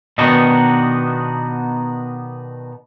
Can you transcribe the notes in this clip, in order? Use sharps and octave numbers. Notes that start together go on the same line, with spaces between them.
B2 D#3 B3 D4 D#4 F#4